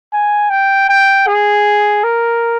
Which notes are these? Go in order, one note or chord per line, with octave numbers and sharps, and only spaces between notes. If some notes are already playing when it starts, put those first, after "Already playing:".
G#5
G5
G5
G#4
A#4